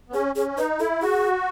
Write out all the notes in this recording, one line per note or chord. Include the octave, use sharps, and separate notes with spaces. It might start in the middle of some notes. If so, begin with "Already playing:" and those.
B3
C#4 G#4
C#4 G#4
D#4 B4
E4 A4
F#4 G#4